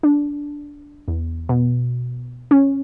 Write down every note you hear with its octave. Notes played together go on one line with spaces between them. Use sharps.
D4
E2
B2
C#4